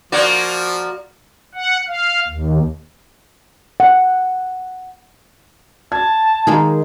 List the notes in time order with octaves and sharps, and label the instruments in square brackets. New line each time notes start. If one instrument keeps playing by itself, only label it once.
[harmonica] F3 [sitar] A#3 F#4 D5
[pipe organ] F#5
F5
D#2
[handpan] F#5
[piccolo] A5 [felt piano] G#6
[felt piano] D#3 D#4 [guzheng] G#3 A#3 G#4